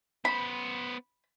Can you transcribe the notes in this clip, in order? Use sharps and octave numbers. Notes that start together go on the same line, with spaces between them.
B3 C5 B5